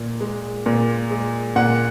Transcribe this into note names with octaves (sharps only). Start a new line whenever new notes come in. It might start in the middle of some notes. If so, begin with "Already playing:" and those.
Already playing: A#2
G#3
A#2
G#3
A#2 F#5